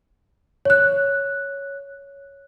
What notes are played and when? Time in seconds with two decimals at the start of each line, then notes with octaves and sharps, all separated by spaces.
0.65 C#5 F#6